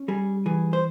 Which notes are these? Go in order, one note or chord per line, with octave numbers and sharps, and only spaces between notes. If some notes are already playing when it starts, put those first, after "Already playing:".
Already playing: C#4
G3 G#4
E3 G#4
C5